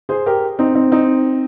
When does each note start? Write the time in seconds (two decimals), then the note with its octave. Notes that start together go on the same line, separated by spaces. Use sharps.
0.09 G#4 C5
0.26 G4 A#4
0.59 C4 D#4
0.75 C4 D#4
0.92 C4 D#4